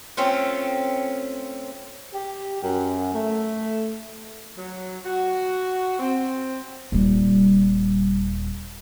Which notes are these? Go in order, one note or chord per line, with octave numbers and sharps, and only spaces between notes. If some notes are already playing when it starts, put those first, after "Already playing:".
A3 C4 C#4 F4
G4
F#2
A3
F#3
F#4
C4
D#1 G3